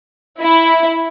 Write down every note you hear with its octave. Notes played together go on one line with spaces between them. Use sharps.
E4